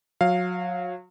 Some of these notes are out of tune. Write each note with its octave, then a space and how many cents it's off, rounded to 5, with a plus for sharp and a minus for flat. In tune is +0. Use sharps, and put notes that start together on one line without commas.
F#3 -30 F5 +0